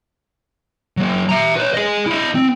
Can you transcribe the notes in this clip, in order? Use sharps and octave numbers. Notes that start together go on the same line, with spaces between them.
F#3 A#3
E5 A#5
B4 C#5
G#4 D#5
E4 D#5
C4